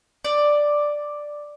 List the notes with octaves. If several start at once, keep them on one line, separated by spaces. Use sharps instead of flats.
D5